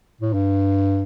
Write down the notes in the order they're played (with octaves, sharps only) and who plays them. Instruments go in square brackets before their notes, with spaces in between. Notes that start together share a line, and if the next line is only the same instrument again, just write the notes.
[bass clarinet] A2
G2